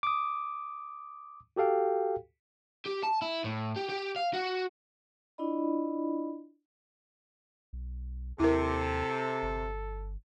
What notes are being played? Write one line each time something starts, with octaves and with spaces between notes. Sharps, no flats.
D6 D#6
F#4 G4 A4 F5 G5
G4
A5
E4
A2
G4
G4
F5
F#4
D4 E4 F4 D5 D#5 B5
B1
D#2 C3 E4 A4 A#4
G1